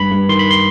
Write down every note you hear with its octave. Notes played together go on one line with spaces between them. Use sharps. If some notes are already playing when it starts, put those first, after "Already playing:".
Already playing: G2 B5
G2
D#3 C6
B5
C6